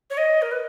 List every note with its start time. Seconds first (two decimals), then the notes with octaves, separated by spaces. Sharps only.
0.10 C#5
0.17 D#5
0.42 A#4
0.51 B4